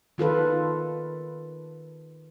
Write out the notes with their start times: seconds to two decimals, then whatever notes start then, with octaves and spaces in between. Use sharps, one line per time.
0.18 D#3 F4 A4 B4